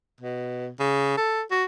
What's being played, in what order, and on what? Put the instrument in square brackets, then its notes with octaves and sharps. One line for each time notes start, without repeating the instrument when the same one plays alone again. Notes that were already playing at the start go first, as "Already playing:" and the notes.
[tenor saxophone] B2
C#3
A4
F#4